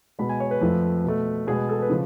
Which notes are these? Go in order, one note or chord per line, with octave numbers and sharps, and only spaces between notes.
B2 G#3 B3 B5
G#5
C#5
B4
F2 F3 A3
B2 A3
B2 G#3 B3 G#4
A4
B4
C#3 F3